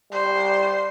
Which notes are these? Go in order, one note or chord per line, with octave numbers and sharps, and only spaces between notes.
G3 C5